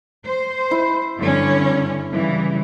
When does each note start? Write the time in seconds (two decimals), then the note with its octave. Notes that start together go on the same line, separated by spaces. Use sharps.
0.23 C5
0.71 E4
1.16 G2 D3 C#4
2.12 C#3 E3 G3